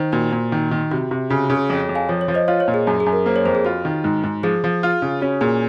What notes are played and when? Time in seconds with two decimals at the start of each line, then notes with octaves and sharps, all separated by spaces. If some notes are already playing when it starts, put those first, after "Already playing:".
Already playing: D#3 C5
0.13 A#2 F#4
0.32 A#2
0.52 D#3
0.71 D#3
0.91 C3 F#4
1.11 C3
1.30 C#3 F#4
1.44 F#4
1.50 C#3
1.57 G#4
1.70 F2 C#5
1.89 F2
1.95 F5 G#5
2.09 F3 C#5
2.21 C#5
2.28 F3
2.34 C5 D#5
2.48 F4 C#5 F5
2.60 C#5
2.68 A#2
2.74 G#4
2.87 F#2 G#4
3.00 G#4
3.06 F#2
3.13 A#4
3.26 A#3 C5
3.36 C#5
3.45 F2 C5
3.55 G#4
3.65 F4 F#4
3.85 D#3
4.04 G#2
4.24 G#2
4.43 F3 G#4
4.64 F3
4.83 F4
5.02 C#3
5.21 C#4 F#4
5.41 A#2 G#4